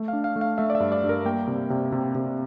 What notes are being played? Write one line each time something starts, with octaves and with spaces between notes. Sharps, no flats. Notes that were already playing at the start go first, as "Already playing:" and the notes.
Already playing: A3
F5
D4
F5
A3
F5
A3 E5
D5
E5
G2
D5
G2
A#4
A#3 G5
C3
C3
C3
C3